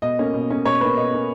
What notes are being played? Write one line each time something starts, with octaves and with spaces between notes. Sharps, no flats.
B2 D#5
A#3 C#4
B2
A#3 C#4
B2 C#5
A#3 C#4 B4
B2 D#5
A#3 C#4